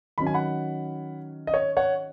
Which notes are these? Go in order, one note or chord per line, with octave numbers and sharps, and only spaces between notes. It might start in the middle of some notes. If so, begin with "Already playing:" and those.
D#3 F#3 C#4 B5
G#5
F#5 B5
D#5
C#5
C#5 F#5